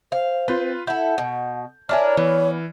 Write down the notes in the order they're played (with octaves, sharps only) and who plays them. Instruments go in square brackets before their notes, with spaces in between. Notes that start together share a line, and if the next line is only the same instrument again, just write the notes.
[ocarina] C5 [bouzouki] F5
[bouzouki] C4 [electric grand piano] F4 B4
[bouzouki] E4 A4 [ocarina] F#5 [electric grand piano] G6
[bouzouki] B2
[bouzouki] D4 E4 A#4 [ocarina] C#5 [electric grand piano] G#5 A5 F6
[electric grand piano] E3 [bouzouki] B3